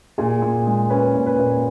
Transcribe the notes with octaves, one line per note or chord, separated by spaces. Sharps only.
A#2 G#4
A#2
G#3
C#4 B4
A#2
B4
A#2